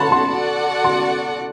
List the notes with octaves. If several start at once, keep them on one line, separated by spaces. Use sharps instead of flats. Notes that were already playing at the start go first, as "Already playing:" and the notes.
Already playing: F#4 A4 C#5 F#5 A5 B5 C6
C6
F#4 A4 D5 F#5
C6